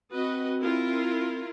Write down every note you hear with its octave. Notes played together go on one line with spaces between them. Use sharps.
C4 F#4 B4 D#5
E4 F4 A#4